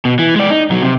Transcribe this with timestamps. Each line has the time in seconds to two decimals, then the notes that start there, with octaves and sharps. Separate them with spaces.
0.05 B2
0.19 E3
0.36 G#3 D5
0.50 D#4
0.70 B1 F#3
0.83 C3